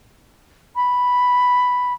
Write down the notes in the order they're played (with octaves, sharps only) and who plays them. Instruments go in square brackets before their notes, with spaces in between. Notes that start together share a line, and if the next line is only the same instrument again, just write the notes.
[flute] B5